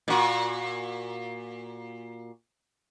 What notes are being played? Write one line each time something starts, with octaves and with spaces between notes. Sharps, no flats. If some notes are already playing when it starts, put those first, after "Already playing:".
A#2 F#4